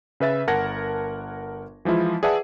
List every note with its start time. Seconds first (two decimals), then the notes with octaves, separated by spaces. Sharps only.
0.20 C#3 B4 E5 A6
0.47 G1 A#4 F#5 A5 G#6 A#6
1.85 E3 F3 G#3 E4 F4
2.23 G#4 B4 D5 E5 F#5 A5